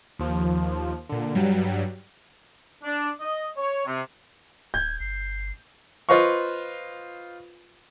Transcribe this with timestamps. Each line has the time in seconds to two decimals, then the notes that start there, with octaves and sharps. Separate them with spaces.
0.19 D#2 F3
1.09 A#2 D3
1.35 G2 F#3 G3
2.84 D4
3.20 D#5
3.57 C#5
3.86 C3
4.74 D#1 G6 G#6
5.00 G1 C7
6.09 F4 B4 C5 D#5 F5 C#6